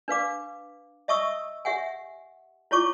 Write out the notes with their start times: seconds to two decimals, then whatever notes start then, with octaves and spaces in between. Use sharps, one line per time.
0.08 D4 B4 F5 D6
1.08 D#5 E5 A5 C#6 D#6 E6
1.65 G4 E5 F#5 G#5
2.71 E4 F4 C#5 A5 C#6 D6